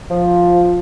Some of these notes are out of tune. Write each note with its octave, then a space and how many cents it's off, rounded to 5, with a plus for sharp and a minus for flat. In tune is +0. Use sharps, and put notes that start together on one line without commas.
F3 +5